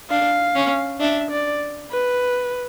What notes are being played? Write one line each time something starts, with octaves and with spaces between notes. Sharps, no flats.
D4 F5
C#4
D4 E5
D5
B4